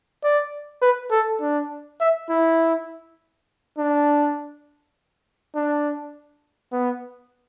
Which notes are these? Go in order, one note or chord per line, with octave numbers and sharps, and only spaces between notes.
D5
B4
A4
D4
E5
E4
D4
D4
B3